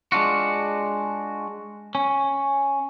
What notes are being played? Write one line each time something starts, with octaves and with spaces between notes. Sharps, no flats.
G#3 D4 F4 F#4
C#4